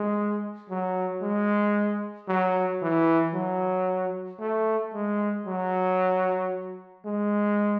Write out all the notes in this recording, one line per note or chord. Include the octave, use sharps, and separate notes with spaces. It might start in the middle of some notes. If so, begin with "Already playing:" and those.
Already playing: G#3
F#3
G#3
F#3
E3
F#3
A3
G#3
F#3
G#3